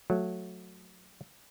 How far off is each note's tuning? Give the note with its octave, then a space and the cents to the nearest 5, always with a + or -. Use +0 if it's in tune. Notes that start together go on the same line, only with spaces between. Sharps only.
F#3 -15 A3 +0